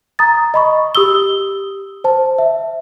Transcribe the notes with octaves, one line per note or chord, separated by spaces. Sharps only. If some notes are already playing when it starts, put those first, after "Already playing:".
A#5 D#6 A6
D#5 B5 C#6
G4 D#6 E6 G7
C5 A5
E5